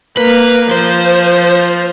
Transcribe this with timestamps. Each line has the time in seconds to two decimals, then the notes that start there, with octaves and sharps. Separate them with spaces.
0.17 A#3 B4
0.71 F3 C5